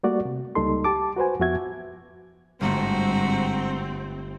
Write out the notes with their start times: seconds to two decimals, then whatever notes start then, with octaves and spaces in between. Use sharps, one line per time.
0.03 G3 A3 A#3 F#4 D5
0.25 C3
0.55 C#2 G3 A#3 D#4 A4 C6
0.84 G4 A5 D6
1.16 F#4 B4 C5 G#5
1.40 F2 F3 B3 F#4 E5 G#6
2.61 G1 G#2 A3 C4 F#4 A#5